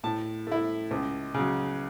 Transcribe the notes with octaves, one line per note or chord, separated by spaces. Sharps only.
A2 A5
A3 E4
C#2
C#3 F#3